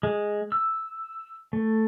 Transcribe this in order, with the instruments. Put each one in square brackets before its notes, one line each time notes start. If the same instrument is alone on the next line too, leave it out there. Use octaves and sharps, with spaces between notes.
[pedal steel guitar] G#3
E6
A3